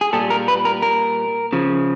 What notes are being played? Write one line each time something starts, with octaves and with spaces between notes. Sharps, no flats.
G#4
A#2 G3 A4
A#4
B4
A#4
A#4
C#3 F3